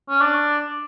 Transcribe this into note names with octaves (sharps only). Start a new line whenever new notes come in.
C#4
D4